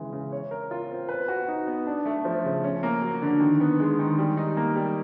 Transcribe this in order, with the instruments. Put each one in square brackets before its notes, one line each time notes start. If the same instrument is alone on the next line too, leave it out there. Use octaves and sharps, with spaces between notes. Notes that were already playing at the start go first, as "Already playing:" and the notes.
Already playing: [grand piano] C#3 E3 G#3
C#3
C#5
A#4
F4
C4
B4
F#4
D#4
B3
D4
A3
F3
C#3
C#4
A#3
F#3
D3
D#3
B3
G#3
D#3
G3
D#4
A#3
G3